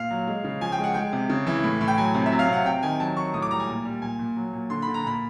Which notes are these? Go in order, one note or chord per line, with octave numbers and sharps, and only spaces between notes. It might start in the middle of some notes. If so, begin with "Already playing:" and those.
Already playing: A#2 F5
F#3
G#3
C#3
F3 G#5
G5
G#3
F#5
G#3 G5
C3
C#3
E3
A2
A2
G5
F#3 G#5
C3
E5
F#3
F5
C3 F#5
C3 G5
D#3 G#5
F#3 A5
F#3 C#6
A2 D#6
D6
G3 A#5
G#5
A#2
G3
A#2 G#5
A#2
F#3
A#2
D3 C6
B5
D3
A#5
A#2 B5